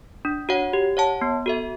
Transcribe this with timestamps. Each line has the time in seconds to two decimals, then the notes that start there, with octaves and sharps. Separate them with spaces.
0.25 D4
0.49 F#4 C#5 F#5
0.73 G4
0.97 C#5 F#5 A5
1.21 B3
1.46 F#4 A4 E5